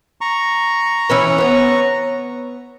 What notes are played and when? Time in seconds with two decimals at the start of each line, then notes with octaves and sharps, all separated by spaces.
0.21 A#5 C#6
1.10 E3 C#4 B4
1.38 B3 C#5